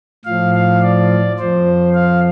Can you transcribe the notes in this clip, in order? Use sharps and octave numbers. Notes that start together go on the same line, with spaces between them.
A2 F3 F5
F5
D5
F2 F3 C5
F5